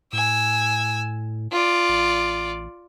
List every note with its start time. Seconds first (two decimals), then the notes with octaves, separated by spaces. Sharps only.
0.13 A2 G#5 E6
1.52 F4 D5
1.89 A1